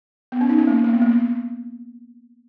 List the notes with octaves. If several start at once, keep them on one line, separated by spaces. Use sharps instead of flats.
B3
C#4
D#4
C#4
A#3
A#3
B3
A#3